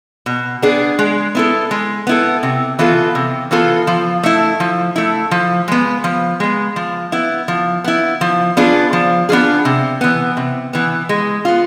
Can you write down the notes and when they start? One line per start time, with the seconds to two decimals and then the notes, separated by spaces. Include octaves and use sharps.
0.26 B2
0.62 B3 D4 G#4
0.99 G#3
1.35 B3 E4 A4
1.71 G#3
2.07 B3 E4 A4
2.43 C3
2.79 E3 B3 F4 A4
3.15 C3
3.51 E3 B3 F4 A4
3.87 F3
4.23 A3 E4
4.60 F3
4.96 A3 E4
5.31 F3
5.68 G#3 B3
6.04 F3
6.40 G#3 B3
6.76 F3
7.12 B3 E4
7.48 F3
7.84 B3 E4
8.21 F3
8.57 B3 D4 F4 G#4
8.93 F3
9.29 B3 D4 F4 G#4
9.65 C3
10.01 E3 B3
10.37 C3
10.73 E3 B3
11.09 G#3
11.45 B3 F4